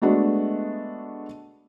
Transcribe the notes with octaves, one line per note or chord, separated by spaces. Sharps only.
G#3 A3 B3 D4 F#4 D#5